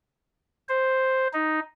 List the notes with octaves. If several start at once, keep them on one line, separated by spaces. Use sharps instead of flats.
C5
D#4